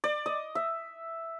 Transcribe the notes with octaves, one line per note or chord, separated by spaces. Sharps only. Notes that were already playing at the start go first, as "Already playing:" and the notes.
D5
D#5
E5